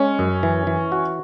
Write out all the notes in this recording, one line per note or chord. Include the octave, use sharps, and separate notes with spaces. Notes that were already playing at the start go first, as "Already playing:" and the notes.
Already playing: G#3 C#4
F#2
E3
E3
F#4